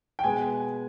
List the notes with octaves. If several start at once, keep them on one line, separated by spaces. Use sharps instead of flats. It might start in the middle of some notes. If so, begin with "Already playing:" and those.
G5
B2 G#3 B3 G#5